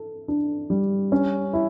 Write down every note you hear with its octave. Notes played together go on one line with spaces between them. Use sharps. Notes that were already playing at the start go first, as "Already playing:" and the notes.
Already playing: A4
D4
G3
C#4
E4